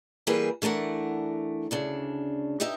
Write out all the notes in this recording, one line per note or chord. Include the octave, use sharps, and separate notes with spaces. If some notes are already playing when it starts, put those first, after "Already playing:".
E3 G3 A#3 G#4 A#4 B4
E3 A3 D4 A#4 F#5
D2 C#3 D4
G2 D#4 G4 D#5 E5